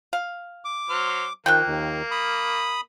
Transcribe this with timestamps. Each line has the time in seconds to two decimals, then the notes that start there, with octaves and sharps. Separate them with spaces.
0.13 F5
0.65 D6
0.89 F#3 C5 F6
1.46 D#3 F3 A#3 G5 F#6 G6
1.67 D#2 D#3
2.11 B5 D#6